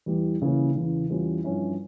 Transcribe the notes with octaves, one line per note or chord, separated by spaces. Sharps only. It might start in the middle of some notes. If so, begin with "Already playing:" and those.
E2 E3 G3
C#2 C#3 E3 A#3 C#4
E2 C#3 E3
E2 E3 G3 C#4 F4
G2 F3 C#4 E4